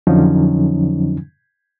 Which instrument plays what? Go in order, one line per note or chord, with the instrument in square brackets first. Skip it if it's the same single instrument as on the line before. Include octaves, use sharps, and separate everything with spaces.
[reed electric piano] F2 D3 F3 F#3 C#4 D#4